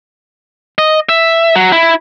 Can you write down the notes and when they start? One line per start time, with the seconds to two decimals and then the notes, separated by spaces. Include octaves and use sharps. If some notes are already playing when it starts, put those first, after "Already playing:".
0.79 D#5
1.09 E5
1.56 F#3
1.72 E4